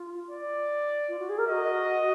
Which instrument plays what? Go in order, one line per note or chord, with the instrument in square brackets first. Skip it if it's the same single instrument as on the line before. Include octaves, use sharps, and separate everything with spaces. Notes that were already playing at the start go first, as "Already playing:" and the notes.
Already playing: [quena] F4
[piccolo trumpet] D5
[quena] F4
F#4
G#4
A#4
[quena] F#4 [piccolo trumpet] D#5